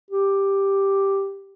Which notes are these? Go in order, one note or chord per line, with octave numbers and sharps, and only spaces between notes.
G4